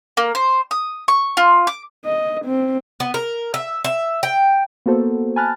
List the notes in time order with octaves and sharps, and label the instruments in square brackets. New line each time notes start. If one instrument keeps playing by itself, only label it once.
[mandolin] A#3
C5
D#6
C#6
F4
D6
[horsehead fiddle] D#5
C4
[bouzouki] B3
A#4
E5
E5
G5
[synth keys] A#3 B3 F#4 A4 C5
G#5 A5 B5 F6 F#6 A6